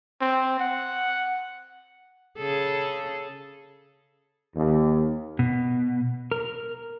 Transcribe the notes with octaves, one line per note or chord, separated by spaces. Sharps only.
C4
F#5
C#3 G#4 A4
D#2
B2
A#4